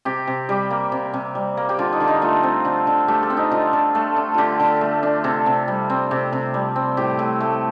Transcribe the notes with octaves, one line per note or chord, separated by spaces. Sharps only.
C3 G4
C3
G3 G4
A#3
C3
C3
G3
A#3
G4
D3 F4
D#4
D3
D#4
A3 F4
C4
D3
D3
A3 G4
A4
C4
D#4
D3 F4
D3
A3
D4
D3 F4 G4
D3
A3
D4
C3 A4
C3
G3
C4
C3 G4
C3
G3
C4
A2 G4
A2
A3